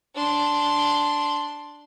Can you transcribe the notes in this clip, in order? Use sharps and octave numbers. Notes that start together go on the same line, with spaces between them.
D4 C6